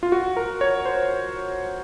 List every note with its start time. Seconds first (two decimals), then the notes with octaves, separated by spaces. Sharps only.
0.03 F4
0.12 F#4
0.37 A#4
0.61 C#5
0.85 C5